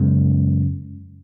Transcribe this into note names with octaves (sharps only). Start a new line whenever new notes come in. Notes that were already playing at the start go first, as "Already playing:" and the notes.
Already playing: F#2 C#3 G#3 B3